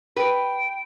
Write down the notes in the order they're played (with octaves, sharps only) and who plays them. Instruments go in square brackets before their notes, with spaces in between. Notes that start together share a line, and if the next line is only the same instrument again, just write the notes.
[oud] B4 [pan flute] G5